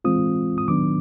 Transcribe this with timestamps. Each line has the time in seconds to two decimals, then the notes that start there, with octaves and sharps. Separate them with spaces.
0.04 E3 G#3 C4 F4 D#6
0.58 D#6
0.68 D#3 F#3 B3 D4 D6